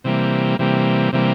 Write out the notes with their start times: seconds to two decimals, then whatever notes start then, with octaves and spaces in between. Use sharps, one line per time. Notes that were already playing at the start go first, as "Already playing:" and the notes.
0.04 C3 E3 G3 A#3
0.59 C3 E3 G3 A#3
1.13 C3 E3 G3 A#3